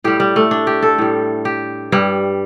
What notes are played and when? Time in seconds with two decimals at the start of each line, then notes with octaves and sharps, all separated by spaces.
0.04 A2 G3 G4
0.20 G3
0.36 A3
0.51 D4
0.67 G4
0.83 A4
0.98 A2 G3
1.45 G4
1.92 G2 G3